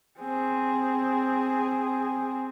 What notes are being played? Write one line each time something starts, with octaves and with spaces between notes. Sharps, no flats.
C4 G#4